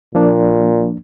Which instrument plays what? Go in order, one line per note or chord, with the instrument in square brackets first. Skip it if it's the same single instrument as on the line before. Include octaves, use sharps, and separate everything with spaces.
[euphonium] A#2 [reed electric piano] F3 A#3 D4